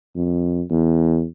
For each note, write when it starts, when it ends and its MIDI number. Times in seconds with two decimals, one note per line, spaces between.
0.15 0.62 41
0.70 1.24 40